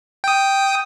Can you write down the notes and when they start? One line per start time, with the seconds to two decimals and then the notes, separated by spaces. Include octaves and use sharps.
0.24 G5 D#6